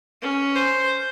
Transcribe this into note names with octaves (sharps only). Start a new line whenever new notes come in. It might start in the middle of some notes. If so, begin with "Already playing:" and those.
C#4
C5